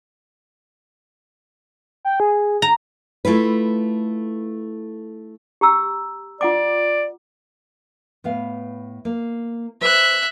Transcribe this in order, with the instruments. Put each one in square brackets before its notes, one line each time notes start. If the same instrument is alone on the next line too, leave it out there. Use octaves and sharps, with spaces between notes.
[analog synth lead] G5
G#4
[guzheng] A#5
[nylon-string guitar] A3 E4 F4 B4
[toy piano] G4 A#5 E6
[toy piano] F4 F#5 D6 [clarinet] D5
[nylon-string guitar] A2 B3 F5
A#3
[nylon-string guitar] B4 C5 [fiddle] E5 F#6